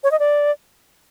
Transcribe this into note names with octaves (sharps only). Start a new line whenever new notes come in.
C#5
D#5
D5